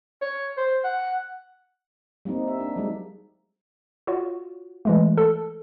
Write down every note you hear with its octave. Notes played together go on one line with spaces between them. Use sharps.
C#5
C5
F#5
G3 A#3 C4 D#4
E5
D4
F#3 G#3 D#4
F4 F#4 C#5
E3 G#3 A3
A4